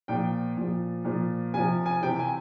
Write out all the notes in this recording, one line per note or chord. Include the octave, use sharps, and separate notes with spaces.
A#2 F3 G5
A#2 F3
A#2 F3
C3 F3 G#5
G#5
C3 E3 G5
G#5